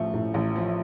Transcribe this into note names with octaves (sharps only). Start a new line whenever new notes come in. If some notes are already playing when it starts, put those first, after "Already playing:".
Already playing: A1 A2 F3 A3
A2
A1
F3